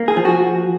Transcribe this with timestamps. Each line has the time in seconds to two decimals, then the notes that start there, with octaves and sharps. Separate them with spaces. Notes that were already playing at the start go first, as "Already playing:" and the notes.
Already playing: A#3
0.08 G#4
0.17 F3
0.25 F#4